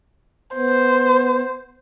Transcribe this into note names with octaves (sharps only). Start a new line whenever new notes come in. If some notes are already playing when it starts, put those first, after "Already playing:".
B3 C5